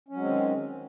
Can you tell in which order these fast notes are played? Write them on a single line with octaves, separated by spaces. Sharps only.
C#4 F#3 G#3 C4 D#3